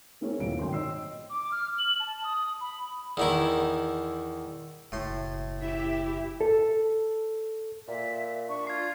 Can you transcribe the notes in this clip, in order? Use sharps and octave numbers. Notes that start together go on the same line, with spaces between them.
B3 C4 E4 G#4 A#4 C#5
D#1 F#2 A#3 F4 D7
G#1 G5 C6
C#5 D#5 E6 C7
D6
F6
F#7
A5
D#6
B5
E2 D#3 E4
F#1 A2 C6
E4 G4 E5
A4
A#2 E5
D4 C#6
F4 G#6 C7